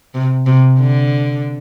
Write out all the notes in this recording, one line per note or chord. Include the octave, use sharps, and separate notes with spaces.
C3
C3
D3